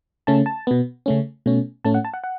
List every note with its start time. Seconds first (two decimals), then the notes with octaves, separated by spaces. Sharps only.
0.27 C#3 A3 C#4 A5
0.46 A5
0.67 B2 B3
1.06 C#3 A3 C#4
1.46 B2 A3 C#4
1.84 A2 A3 C#4 A5
1.94 F#5
2.05 A5
2.14 F#5
2.24 F#5